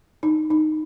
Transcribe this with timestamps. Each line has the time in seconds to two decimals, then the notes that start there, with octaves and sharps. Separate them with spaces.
0.23 D#4
0.50 D#4